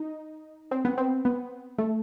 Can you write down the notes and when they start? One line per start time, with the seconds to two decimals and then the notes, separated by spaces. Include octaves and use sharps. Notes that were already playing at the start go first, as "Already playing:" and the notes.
Already playing: D#4
0.71 C4
0.85 B3
0.98 C4
1.25 B3
1.78 A3